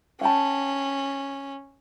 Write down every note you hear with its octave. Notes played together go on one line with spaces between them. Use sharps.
C#4 F#5 G5 A5